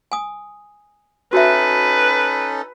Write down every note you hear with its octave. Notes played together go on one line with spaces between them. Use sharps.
G#5 D#6
C#4 D#4 F#4 A4 B4 E5